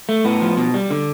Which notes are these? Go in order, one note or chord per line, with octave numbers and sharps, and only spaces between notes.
A3
A2 B3
F3
B2
G3
D3